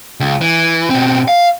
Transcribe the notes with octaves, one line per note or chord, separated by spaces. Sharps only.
C#2
E3
B2 C4
F5